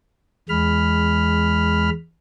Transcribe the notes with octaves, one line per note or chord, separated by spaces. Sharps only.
E2 G#3 B5 F6